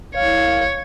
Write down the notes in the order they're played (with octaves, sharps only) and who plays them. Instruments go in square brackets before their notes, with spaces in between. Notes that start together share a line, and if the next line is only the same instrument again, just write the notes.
[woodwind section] C2 F5 [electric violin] C#5